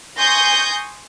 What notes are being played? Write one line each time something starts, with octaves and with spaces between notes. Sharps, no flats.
G#5 C6 C#6 D#6 G6 A#6